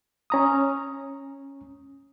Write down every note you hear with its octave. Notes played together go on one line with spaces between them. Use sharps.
C#4 A#5 D#6